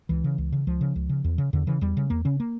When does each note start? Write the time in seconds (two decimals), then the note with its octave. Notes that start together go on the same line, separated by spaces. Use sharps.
0.09 C#2 E3
0.24 C#3
0.38 C#2
0.52 C#3
0.67 C#2 F3
0.81 C#3
0.96 C#2
1.09 C#3
1.24 E2
1.38 C#3
1.53 E2 D3
1.67 C#3 E3
1.81 E2 G3
1.97 C#3
2.10 E2 A#3
2.25 C#3 C#4
2.40 A#3